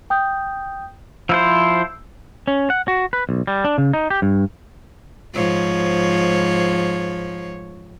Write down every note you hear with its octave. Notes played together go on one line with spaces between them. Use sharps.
G5 D#6 G6
F3 E4 C5 E6
C#4
F#5
F#4
B4
B1
G3
D4
C#3
D#4
G4
G2
G#2 F3 C#5